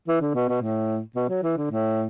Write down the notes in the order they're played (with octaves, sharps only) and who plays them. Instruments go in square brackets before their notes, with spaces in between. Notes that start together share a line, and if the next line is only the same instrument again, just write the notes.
[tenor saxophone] E3
D3
B2
B2
A2
B2
F#3
E3
D3
A2